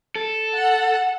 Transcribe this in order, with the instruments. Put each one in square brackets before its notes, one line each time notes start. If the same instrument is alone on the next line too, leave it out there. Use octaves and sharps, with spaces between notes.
[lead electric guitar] A4
[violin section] F#5